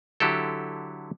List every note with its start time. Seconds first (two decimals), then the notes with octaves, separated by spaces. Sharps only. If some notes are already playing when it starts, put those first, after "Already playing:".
0.20 D3 F#3 E4 G4 A4